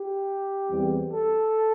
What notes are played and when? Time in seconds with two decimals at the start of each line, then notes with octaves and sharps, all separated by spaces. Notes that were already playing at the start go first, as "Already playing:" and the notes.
Already playing: G4
0.68 E2 E3 G3 C4
1.11 A4